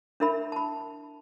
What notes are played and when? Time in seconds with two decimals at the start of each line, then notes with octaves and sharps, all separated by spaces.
0.20 D4 E4 A#4 E5 B5
0.52 A5 B5